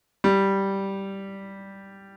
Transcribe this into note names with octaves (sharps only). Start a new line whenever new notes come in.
G3